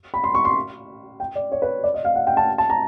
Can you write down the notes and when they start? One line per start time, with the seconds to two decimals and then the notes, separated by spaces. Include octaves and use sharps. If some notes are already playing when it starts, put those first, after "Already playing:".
0.14 B5
0.24 C6
0.35 C#6
0.45 C6
1.20 G5
1.35 D5
1.52 C#5
1.62 B4
1.84 D5
1.94 D#5
2.05 F5
2.16 F#5
2.27 G5
2.37 A5
2.58 A5
2.70 A#5